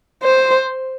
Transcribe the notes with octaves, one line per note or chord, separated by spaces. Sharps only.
C5